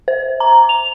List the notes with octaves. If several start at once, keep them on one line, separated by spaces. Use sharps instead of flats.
C5
A#5
F7